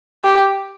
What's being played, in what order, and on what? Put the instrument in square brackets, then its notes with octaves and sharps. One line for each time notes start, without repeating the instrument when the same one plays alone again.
[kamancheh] G4